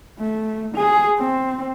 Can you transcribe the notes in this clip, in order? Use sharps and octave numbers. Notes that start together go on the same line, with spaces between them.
A3
G#4
C4